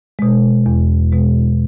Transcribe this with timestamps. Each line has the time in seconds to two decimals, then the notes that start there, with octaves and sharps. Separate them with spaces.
0.19 B2 G#3
0.66 E2
1.12 B2 G#3